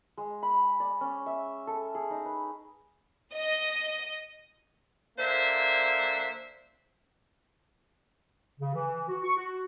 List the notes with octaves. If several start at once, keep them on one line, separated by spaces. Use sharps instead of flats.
G#3
B5
D5
C#4
E5
A4
G#4
D#4
B4
D#5
D3 A#3 D4 C5 E5
C#3
E3
F#4
C#6
F#4